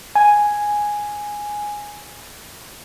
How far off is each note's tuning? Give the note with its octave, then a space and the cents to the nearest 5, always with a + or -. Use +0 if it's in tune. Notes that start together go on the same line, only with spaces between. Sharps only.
G#5 +0